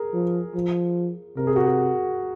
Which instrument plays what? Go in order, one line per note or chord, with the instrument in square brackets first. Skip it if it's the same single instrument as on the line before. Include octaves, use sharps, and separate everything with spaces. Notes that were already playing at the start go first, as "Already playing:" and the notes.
Already playing: [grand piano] G#4 A#4
[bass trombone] F3
F3
[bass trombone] C3 [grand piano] A#4
[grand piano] G#4
F#4
G#4